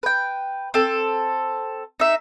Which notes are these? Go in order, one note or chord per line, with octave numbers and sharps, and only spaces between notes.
B4 G5
C4 A4
D#4 E5